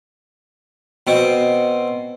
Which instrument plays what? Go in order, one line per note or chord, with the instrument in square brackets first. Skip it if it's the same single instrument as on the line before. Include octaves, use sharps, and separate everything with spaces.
[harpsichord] B2 C4